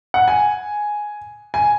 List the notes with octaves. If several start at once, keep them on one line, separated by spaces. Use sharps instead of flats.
F#5
G#5
G#5